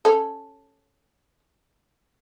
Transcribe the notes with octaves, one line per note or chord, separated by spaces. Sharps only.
C#4 A4